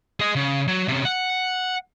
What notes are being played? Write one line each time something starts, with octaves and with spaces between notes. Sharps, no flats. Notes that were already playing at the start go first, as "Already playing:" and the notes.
G#4 D#5
C#3
F#3
C3 C#4
F#5